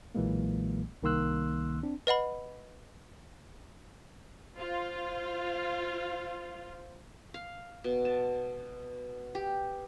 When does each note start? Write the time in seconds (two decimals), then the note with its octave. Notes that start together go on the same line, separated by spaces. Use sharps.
0.15 B1 A#2 E3 F#3 G#3 A#3
1.03 C2 D#3 A#3 C6 E6 F#6
1.83 C4 D4
2.07 B4 D#5 F#5 B5
4.59 F4 C5
7.34 F5
7.84 B2
8.05 A5
9.35 G4